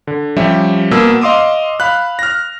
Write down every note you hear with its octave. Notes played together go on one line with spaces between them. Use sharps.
D3
F3 G3 C#4 G4 E5
B2 A#3 E6
D#5 F5 C6 D6 D#6
F5 B5 F#6
F6 A#6